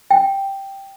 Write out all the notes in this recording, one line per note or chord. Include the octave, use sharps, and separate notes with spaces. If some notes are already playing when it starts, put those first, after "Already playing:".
G5